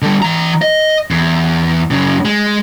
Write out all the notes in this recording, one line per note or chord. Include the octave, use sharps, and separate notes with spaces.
D3 G3
E3 A#5
D#5
E2
F#2 C#3
G#3